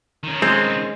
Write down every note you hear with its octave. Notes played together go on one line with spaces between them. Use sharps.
D#3 C#4
G#3 C4